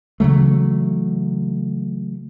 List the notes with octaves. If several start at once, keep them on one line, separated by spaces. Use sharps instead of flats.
C#3 E3 F#3 A3